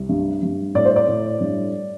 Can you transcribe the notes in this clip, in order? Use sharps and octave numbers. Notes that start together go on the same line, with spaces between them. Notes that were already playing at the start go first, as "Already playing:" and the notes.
Already playing: C2
G2
G2
A2 D5
C5
D5
A2
G2